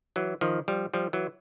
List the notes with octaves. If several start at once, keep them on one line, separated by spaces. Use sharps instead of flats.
E3 F#3
D#3 F3
F3 G3
F3 G3
E3 F#3